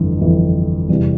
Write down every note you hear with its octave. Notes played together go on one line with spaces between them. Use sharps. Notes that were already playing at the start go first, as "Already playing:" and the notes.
Already playing: G1 F2 E3
G1 F2 E3
E2 C3 E3 G3